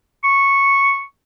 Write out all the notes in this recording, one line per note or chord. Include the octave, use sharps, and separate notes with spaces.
C#6